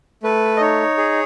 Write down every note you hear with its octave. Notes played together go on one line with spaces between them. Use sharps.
A3 B4
D#5
D#4 C#5
G#4